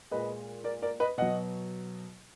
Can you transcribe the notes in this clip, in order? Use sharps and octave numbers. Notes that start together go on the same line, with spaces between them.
A#2 G#3 B4 D#5
A#4 D5
A#4 D5
B4 D#5
B2 F#3 D#5 F#5